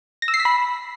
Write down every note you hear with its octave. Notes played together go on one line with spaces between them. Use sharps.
A#6
E6
C7
B6
B5